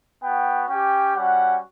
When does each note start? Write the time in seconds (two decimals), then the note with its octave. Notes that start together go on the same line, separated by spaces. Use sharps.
0.22 B3 F#4 G5
0.68 C#4 G4 G5
1.16 G3 C#4 F#4 F#5